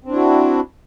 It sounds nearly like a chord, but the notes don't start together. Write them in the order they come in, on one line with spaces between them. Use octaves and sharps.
C4 D4 E4 F#4